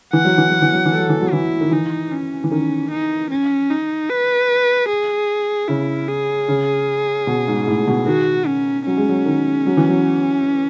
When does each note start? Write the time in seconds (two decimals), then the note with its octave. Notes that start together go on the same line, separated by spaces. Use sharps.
0.13 E3 F#5
0.25 F#3
0.38 E3
0.50 F#3
0.62 E3
0.73 F#3
0.85 E3
0.92 A4
0.98 F#3
1.09 E3
1.21 F#3
1.32 E3 E4
1.61 D#3
1.71 E3 D#4
2.12 C#4
2.44 E3
2.51 D#3 C#4
2.91 D#4
3.30 C#4
3.70 D#4
4.10 B4
4.89 G#4
5.68 C#3 E4
6.08 G#4
6.48 C#3
7.27 B2
7.48 G#2
7.68 A2
7.88 B2
8.06 D#3 F#4
8.47 C#4
8.86 F#3 C#4
8.97 G#3
9.09 F#3
9.26 D#3
9.66 F#3
9.77 E3
9.89 F#3